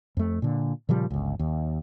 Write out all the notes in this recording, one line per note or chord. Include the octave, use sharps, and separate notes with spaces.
F2 A3
A#2 D3
A#2 C#3 F3 G3
G1 C#2
D#2